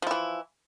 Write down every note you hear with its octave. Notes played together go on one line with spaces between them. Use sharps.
E3 F3 E4